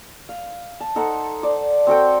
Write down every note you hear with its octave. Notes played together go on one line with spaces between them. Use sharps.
F5
A5
D#4 A4 C5 F#5
C5 D5
C4 F#4 A4 G5